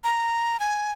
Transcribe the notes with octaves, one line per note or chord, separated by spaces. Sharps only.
A#5
G#5